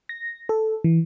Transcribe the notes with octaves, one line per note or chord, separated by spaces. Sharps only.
A#6
A4
E3